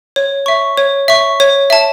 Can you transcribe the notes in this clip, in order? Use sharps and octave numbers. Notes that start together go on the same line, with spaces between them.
C#5
E5 C#6
C#5
E5 C#6
C#5
E5 A5